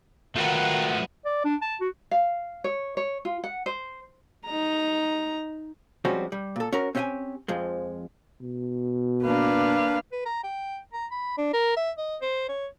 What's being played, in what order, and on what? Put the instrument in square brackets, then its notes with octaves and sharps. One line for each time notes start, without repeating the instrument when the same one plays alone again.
[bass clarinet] D#3 [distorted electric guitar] F#3 F4 [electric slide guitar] A3 F#4 B4 [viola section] F#5
[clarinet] D5
D4
A5
F#4
[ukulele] F5
C#5
C#5
F4
F#5
C5
[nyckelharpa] D#4 A#5
[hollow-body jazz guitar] F3 G3 G#3 C4 C#4 F#4
G3
A#2 A4
C#4 F#4 A#4
C4 C#4 G4 D#5 G5 G#5
F2 F3 G#3
[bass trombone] B2
[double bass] A#3 D4 [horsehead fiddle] B4 F5
[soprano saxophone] B4
A#5
G5
A#5
B5
D4
A#4
E5
D#5
C5
C#5